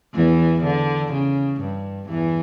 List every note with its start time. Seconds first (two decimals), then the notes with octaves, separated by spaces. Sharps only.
0.15 E2 E3
0.64 D3
1.12 C#3
1.61 G2
2.09 E2 E3